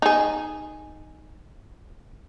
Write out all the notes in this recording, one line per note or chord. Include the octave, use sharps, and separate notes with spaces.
D#4 G#4